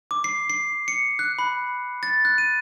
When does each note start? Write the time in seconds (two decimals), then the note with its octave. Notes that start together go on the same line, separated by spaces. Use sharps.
0.11 D6
0.24 C7
0.50 C7
0.88 C#7
1.19 F#6
1.39 B5
2.03 A6
2.25 F#6
2.38 D#7